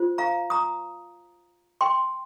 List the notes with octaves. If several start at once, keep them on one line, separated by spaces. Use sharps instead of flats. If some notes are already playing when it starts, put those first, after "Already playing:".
Already playing: F4 C5
F5 A#5
A#5 D#6
G5 C6